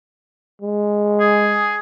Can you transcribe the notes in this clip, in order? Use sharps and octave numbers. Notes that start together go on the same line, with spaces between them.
G#3
G#4